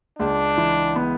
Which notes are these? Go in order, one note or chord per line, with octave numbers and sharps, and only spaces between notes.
C#2 D4
E3
B3